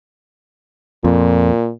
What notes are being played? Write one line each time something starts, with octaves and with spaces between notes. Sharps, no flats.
F2 A#2